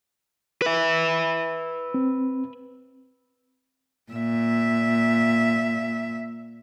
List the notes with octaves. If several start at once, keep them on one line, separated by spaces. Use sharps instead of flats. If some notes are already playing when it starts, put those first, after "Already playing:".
B4 E5
C4
A#2 E5